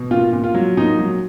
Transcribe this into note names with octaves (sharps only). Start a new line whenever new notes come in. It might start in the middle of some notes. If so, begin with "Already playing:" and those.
Already playing: B2
A#2 F4
A#2
F4
F#3
A#2 D#4
F#3